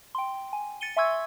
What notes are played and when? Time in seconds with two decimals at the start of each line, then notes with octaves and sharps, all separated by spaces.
0.15 G5 C6
0.53 G#5
0.81 A6 C#7 D#7 G7
0.96 E5 G#5 C6 C#6 E6 G#6